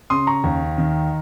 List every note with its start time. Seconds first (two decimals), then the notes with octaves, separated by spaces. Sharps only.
0.10 C#3 C6 D#6
0.27 A#5 C#6
0.44 D#2
0.78 D#3